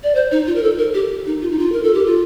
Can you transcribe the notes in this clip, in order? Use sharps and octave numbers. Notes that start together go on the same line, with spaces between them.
D5
C5
D#4
F4
A#4
A4
A#4
G4
D#4
F4
D#4
F4
A#4
A4
G4
F4